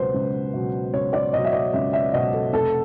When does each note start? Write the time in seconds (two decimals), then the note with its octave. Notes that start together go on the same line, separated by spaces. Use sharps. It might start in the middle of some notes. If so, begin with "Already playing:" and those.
Already playing: C#2 B2 F#3 B4 C5
0.14 C#2
0.54 B2 F#3
0.93 C#2 C#5
1.13 D5
1.33 B2 F#3 D#5
1.44 E5
1.53 D#5
1.73 C#2 E5
1.93 E5
2.14 B2 F#3 D#5
2.33 A4
2.53 F1 A4